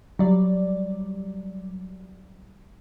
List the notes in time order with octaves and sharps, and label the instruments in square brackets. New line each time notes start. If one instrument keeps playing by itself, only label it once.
[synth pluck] F#3 G3 D5